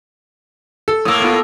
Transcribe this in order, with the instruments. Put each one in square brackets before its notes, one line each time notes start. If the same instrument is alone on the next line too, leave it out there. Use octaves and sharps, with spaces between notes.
[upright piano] A4
[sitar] A2 A#3 [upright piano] D#6 E6
[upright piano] B3 F4